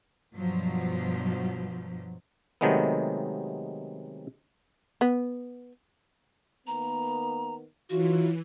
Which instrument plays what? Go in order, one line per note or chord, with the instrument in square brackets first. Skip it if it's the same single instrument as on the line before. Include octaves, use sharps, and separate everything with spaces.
[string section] G2 B2 F3 F#3
[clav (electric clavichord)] C3 D#3 F#3 G#3 A3 B3
[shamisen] B3
[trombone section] D#3 A#3 B3 [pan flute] A#5
[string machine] E3 [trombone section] F#3 D#4 F4 [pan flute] F#4